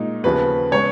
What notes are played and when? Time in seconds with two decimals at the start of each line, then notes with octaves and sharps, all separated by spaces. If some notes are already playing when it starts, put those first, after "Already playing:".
Already playing: A#2 G#3 D#4
0.24 D#2 C#3 F3 B3 B4
0.71 C#3 G#3 B3 C#5